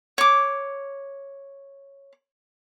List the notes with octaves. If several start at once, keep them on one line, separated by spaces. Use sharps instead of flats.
C#5 D6